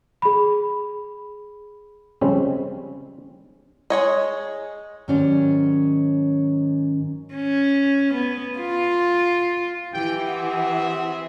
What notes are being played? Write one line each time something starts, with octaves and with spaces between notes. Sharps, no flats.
G#4 B5
C#3 F3 G3 G#3 C4 C#4
G#3 C#5 D#5
G#2 D#3 F#3 C#4 G4 D5
C#4
B3
F4
E3 E4 G4 G5
C4 G#4 E5 F#5